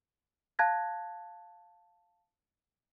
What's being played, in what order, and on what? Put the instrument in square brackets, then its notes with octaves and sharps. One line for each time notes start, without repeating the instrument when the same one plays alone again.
[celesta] F5 A5 F#6 G#6 A#6